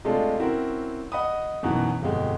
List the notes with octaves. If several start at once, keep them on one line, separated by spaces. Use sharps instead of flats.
C3 G#3 A3 D4 F4 A4
C4 C#4 E4 F#4 A#4
D#5 F#5 B5 D#6
F#2 B2 D#3 E3
G1 F2 B2 G#3 G4